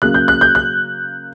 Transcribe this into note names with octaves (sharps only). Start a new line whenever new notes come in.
C#3 F#3 A#3 F#6
G6
F#6
G6
F#6